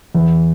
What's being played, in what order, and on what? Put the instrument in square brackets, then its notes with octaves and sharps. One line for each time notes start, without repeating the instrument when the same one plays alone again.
[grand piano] E2